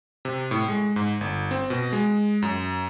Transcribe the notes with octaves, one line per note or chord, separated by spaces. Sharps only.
C3
A2
G#3
G#2
G1
C4
B2
G#3
F#2